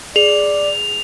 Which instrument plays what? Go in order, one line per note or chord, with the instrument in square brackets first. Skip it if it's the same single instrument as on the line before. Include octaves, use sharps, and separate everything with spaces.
[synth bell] G#4 [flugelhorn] D5 [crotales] F7